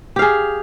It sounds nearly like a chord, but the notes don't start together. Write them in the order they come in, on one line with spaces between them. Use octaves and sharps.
G4 F5 G#4